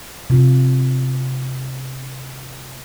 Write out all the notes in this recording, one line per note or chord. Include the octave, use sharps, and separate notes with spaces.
C3 F4